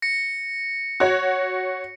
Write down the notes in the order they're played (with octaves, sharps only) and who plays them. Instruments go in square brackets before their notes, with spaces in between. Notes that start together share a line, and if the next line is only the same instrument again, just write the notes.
[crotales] A#6 C#7
[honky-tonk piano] F#4 C#5